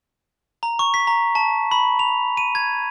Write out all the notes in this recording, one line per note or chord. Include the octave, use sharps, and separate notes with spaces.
A#5
C#6
B6
A#5
A5
B5
F7
D#7
G#6